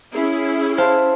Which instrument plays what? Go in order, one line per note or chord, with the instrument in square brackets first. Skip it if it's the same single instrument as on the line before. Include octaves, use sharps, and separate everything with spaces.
[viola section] C#4 E4 G#4
[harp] C5 F5 A5